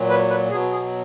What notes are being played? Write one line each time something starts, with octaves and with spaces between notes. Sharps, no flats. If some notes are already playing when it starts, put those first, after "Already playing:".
Already playing: A#2 F#3
B4
B4
B2 F#3 G#4
G#4